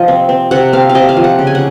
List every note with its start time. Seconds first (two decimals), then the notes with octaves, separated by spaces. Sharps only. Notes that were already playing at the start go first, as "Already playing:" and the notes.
Already playing: C3 F3 D#5 F5
0.08 C4
0.29 C4
0.51 C3 F#5
0.73 C4 F5
0.89 F5
0.95 C3 D#5
1.09 F5
1.17 F3
1.24 F#5
1.39 C#3
1.47 G#5
1.55 F#5